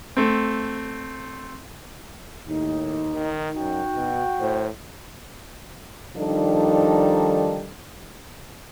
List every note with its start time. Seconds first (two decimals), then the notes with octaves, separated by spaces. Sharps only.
0.17 A3 C4
2.48 D#2 A2 D#4
3.15 D#3
3.57 F#2 F#4 G5
3.96 B2
4.40 A2 C5
6.17 D#3 F3 G3 D4 D#4 A4